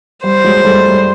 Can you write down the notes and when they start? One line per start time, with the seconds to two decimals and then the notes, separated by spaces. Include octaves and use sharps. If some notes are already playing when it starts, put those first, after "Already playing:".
0.24 G3 C5
0.44 F#3 G#3
0.65 G3 A3
0.86 G3